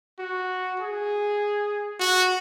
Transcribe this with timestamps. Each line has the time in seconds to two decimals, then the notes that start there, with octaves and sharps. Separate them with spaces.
0.19 F#4
0.79 G#4
1.99 F#4